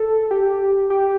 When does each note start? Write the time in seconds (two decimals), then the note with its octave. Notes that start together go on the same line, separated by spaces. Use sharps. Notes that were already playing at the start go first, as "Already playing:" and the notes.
Already playing: A4
0.31 G4
0.90 G4